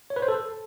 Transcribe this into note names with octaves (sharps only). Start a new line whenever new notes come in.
C#5
B4
C5
A4